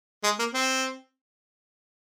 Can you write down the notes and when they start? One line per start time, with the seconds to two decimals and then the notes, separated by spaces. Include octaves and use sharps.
0.24 G#3
0.39 A#3
0.54 C4